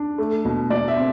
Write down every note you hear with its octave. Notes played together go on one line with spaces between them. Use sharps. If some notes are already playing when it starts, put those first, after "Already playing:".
Already playing: D4
A3
B2
B2 D5
E5
C4